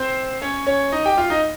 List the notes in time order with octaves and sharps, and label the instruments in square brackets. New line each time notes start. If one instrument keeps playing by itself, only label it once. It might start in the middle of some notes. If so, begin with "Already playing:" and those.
Already playing: [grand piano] C4 C5
C#4 C#5
C#4 C#5
D#4 D#5
G4 G5
F4 F5
D#4 D#5